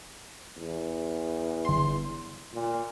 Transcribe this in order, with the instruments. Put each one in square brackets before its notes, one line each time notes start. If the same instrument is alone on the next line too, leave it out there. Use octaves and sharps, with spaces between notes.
[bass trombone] E2
[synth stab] G1 C6
[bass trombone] A#2